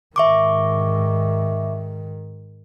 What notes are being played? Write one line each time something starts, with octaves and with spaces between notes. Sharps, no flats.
G#2 D#3 E5 C#6 D6